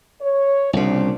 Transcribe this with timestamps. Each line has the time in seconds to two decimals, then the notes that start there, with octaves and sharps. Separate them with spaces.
0.21 C#5
0.73 C2 A#2 C#3 D4 C5